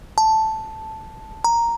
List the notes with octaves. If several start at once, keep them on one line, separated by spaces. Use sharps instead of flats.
A5
A#5